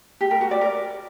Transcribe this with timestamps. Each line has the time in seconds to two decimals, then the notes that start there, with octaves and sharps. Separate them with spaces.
0.21 G4
0.31 A#4
0.41 F#4
0.51 D5
0.61 A#4